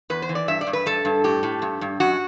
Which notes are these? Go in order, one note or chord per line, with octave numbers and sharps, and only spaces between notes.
E2 B4
C5
E3
D5
G2 E5
D5
G2
B4
G2 A4
G2
A2 G4
A2
G2
G2
F#2 F#4